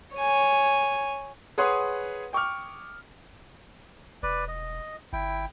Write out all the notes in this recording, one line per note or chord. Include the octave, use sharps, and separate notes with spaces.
C#5 G#5
G#4 B4 C#5 F#5 C6 D#6
G5 C#6 D6 F6
E1 B4 D5
D#5
G1 E4 G5